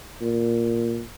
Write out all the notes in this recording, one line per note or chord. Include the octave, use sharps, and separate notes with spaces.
A#2